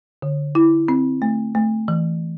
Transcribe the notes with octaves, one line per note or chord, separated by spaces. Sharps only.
D3
E4
C4
A3
A3
E3